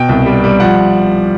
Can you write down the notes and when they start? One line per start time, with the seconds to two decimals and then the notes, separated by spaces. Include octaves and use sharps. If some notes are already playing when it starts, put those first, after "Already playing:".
Already playing: B2 G5
0.09 C2
0.26 G3
0.44 G3
0.60 F3 F#5